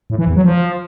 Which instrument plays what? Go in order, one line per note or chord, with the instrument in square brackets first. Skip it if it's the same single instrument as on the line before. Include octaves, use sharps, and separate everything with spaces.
[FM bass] A2
E3
E2
F#3
F3